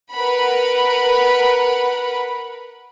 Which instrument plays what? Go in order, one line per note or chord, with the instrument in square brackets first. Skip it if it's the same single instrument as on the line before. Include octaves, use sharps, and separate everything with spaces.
[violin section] A#4 B4 F#5 B5